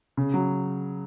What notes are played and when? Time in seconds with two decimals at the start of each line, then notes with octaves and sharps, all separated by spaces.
0.17 C#3
0.34 F#3